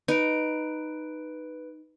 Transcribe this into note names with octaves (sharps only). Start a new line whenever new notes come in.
D#4 B4 D7